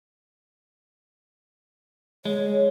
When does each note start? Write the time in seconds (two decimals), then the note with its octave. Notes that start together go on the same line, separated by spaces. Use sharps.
2.25 G#3 C#5